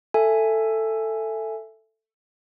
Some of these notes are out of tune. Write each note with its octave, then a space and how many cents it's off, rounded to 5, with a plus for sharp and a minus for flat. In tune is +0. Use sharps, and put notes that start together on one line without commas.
A4 +10 E5 +10 G#5 +0